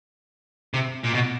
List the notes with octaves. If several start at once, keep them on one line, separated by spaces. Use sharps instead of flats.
C3
A#2
B2